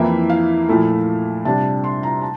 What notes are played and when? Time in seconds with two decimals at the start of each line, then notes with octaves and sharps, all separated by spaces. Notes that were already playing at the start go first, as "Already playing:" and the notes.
Already playing: F2 E3 A#3 E4 E5
0.30 F5
0.69 A#2 F3 A3 E4
1.45 C3 G3 D4 A5
1.84 C6
2.03 A#5
2.21 A5